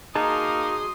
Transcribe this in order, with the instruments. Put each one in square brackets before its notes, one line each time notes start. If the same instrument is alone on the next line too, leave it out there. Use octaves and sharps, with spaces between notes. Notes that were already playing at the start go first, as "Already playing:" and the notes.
[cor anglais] A#3 [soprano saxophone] D#4 [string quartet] F#4 C6 D#6 [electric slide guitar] G#4 D#5 A5